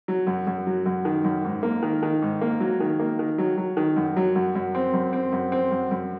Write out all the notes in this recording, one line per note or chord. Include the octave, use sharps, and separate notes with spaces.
F#3
F#2
F#2
F#3
F#2
D#3
F#2
G#2
A#3
D#3
D#3
G#2
A#3
F#3
D#3
A#3
D#3
F#3
F#3
D#3
F#2
F#3
F#2
F#2
C4
F#2
C4
F#2
C4
F#2
F#2